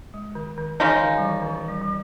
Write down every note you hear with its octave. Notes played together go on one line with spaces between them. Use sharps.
G#3
D#3
D#3
C#3 E3 G#3 D#4
D#3
G3
E3
D#3
E3
G3
G3